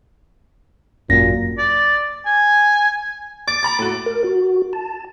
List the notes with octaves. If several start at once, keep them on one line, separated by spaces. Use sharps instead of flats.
G#1 F#2 A#2 F#4 A#6
D5
G#5
D6 A6
A#5 B5 A6
A2 F#4
A#4
F#4
A5